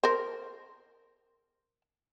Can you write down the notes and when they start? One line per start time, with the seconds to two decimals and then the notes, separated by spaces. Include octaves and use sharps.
0.04 A#4 C5